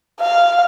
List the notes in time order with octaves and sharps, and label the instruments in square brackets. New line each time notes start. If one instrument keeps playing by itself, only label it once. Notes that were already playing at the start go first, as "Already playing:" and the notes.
[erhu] F5